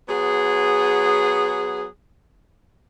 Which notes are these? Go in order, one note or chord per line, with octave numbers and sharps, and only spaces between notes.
F#3 B3 G#4